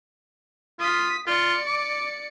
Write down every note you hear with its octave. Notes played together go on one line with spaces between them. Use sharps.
F4 D#6 B6
F4 D5 C#7
D6